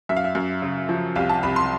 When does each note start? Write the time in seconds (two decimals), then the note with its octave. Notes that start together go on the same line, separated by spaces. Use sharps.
0.09 F#2 E5
0.17 F5
0.24 E5
0.35 F#2
0.62 C#3
0.89 F3
1.16 C2 F5
1.29 A5
1.43 C2 B5
1.56 C6